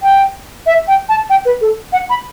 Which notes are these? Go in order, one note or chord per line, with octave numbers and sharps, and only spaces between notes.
G5
E5
G5
A5
G5
B4
A4
F#5
B5